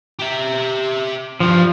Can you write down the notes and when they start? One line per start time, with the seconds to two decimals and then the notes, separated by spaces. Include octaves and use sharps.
0.19 G4 E5
1.40 G2 F3 G3